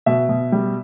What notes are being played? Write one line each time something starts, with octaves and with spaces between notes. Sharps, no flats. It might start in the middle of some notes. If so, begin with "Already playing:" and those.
B2 E5
B2
G3